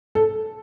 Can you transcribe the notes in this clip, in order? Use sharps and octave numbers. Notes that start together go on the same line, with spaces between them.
A4